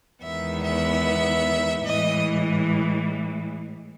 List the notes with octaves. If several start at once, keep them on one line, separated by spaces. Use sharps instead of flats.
E2 D#3 G#3 B3 E5
E5
A2 E3 G#3 D#5